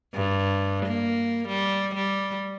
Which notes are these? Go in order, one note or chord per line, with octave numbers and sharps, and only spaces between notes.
G2
A#3
G3
G3